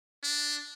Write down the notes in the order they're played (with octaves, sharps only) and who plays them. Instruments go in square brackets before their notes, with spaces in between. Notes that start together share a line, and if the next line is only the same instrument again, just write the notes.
[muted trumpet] D4